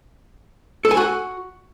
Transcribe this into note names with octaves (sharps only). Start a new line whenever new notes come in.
A4
G#5
F#4